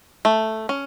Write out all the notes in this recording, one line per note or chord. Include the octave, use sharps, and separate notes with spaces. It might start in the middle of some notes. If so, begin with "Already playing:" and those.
A3
C#4